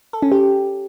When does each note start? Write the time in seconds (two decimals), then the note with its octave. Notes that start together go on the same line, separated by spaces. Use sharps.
0.13 A4
0.22 C#4
0.32 G4